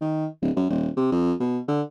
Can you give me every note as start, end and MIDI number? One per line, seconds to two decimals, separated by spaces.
0.01 0.26 51
0.42 0.51 26
0.56 0.65 42
0.70 0.89 27
0.97 1.07 48
1.12 1.33 41
1.40 1.60 47
1.68 1.82 50